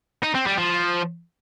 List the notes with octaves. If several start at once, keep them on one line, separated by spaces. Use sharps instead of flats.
D#4
C4
G3
F3